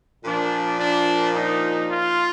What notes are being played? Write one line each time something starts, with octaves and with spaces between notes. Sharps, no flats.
A#2 F3 D4
D4
D#4
F4